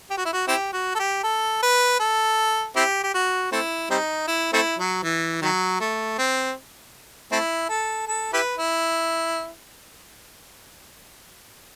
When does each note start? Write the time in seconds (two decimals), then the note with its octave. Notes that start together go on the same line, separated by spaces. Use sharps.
0.10 G4
0.18 F#4
0.25 E4
0.33 F#4
0.48 C4 E4 G4
0.73 F#4
0.95 A4
1.00 G4
1.24 A4
1.63 B4
2.00 A4
2.76 C4 E4 G4
3.04 G4
3.14 F#4
3.52 A3 C4 E4
3.90 G3 C4 D#4
4.27 E4
4.53 A3 C4 E4
4.78 F#3
5.03 E3
5.42 D#3 F#3
5.80 A3
6.18 C4
7.32 A3 C4 E4
7.69 A4
8.07 A4
8.33 E4 G4 B4
8.58 E4